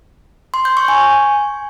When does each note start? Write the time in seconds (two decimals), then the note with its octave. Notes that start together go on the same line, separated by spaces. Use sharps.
0.54 C6
0.65 G6
0.77 C#6
0.88 G#5